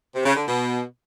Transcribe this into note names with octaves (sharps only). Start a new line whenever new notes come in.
C3
C#3
D3
B2